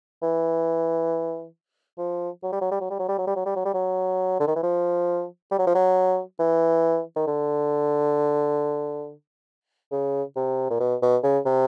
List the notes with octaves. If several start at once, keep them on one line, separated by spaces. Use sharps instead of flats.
E3
F3
F#3
G3
F#3
G3
F#3
G3
F#3
G3
F#3
G3
F#3
G3
F#3
G3
F#3
D3
D#3
E3
F3
G3
F#3
F3
F#3
E3
D#3
D3
C#3
C3
A#2
B2
B2
C#3
C3